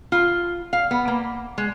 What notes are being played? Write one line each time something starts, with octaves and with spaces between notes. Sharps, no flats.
F4
F5
B3
A#3
G#3